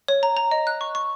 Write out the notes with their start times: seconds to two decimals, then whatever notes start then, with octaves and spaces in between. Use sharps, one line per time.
0.08 C#5
0.23 A#5
0.37 A#5
0.51 D#5
0.67 F#6
0.81 C#6
0.95 C#6